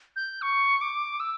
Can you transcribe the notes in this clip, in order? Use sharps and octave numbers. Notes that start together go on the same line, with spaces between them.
G6
C#6
D6
E6